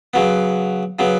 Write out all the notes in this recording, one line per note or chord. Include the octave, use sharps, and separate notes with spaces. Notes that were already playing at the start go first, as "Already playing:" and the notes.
C#3 F#3 B3
C#3 F#3 B3